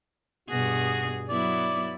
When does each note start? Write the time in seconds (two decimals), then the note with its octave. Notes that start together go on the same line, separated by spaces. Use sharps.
0.49 G2 B2 F#4 G#4
1.29 F#3 B3 E4 D5